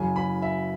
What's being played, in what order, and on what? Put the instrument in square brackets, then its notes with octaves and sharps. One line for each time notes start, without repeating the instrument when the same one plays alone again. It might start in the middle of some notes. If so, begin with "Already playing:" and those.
Already playing: [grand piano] F#1 F#2 C#3 G#5
B5
E5